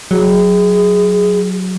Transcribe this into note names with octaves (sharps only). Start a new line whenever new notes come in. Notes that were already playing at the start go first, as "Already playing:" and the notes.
F#3 G#4